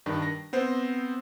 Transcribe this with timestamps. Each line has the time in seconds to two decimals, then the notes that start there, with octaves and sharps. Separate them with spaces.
0.06 G2 D#3 D4
0.22 A#6
0.53 B3 C4 C5